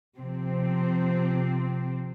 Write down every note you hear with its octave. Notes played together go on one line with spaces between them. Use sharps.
C3 F3 C4